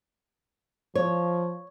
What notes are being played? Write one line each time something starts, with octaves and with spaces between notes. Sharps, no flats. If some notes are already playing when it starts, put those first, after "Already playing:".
F3 C#5